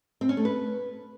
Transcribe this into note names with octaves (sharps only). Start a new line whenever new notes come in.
C4
C#4
A3
B4